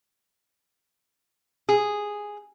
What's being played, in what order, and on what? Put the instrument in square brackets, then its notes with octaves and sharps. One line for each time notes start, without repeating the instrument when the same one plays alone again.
[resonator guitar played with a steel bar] G#4